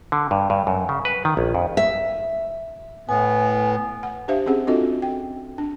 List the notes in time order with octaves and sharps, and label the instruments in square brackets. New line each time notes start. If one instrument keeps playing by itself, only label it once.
[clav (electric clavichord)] D3
G2
G2
F#2
C#3
B4
D#3
A#1
F2
[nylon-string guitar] E5
[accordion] A2 B3 [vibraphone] G#5
[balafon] F#5
D4 G4 C5 E5 F5
C4 C#4 G#4 F#5
C4 D4 F4 F#4 A4 D#5
G5
D4